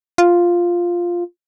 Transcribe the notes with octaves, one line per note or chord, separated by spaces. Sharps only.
F4